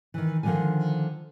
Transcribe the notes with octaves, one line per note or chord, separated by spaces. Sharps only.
D#3 E3
D3 D#3 F3 F#3 D4 G#5